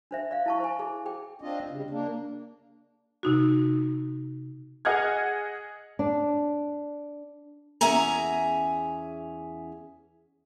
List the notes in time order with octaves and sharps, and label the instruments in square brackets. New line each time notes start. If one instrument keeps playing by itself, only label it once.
[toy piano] D4 C5 E5
D5 F5
E4 A5 C#6
C5 G#5
G#4
G#4 G5
[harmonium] C4 D4 F4 D#5
C#3 G3
A#3 D4
[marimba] C3 D#4 F#4
[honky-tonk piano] G#4 D#5 F#5 F6 G#6
[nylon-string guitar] D4
[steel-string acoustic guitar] E2 C#4 G#4 E5 G#5 A#5